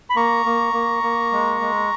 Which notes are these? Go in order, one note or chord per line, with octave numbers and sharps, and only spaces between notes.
B5
A#3 A#5 C#6
A#3
A#3
A#3
G#3
G#3